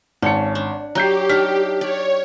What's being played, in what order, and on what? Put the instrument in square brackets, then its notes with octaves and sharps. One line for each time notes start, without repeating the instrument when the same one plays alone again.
[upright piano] G#1 A5 C#7 [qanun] C#4
[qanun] D4
[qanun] F#3 [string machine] G4 [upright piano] A#5 G6 C7
[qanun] D4 D#4 [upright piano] F6 B6
[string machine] C#5 [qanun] D5